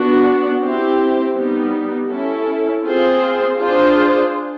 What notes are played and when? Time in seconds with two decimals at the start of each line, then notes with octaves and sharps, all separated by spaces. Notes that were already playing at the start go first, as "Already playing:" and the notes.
Already playing: B3 D4 F#4
0.62 C4 E4 G4 C5
1.36 G3 B3 D#4
2.10 C#4 E4 A4
2.84 C4 F4 G#4 C5
3.58 D4 F4 G#4 C5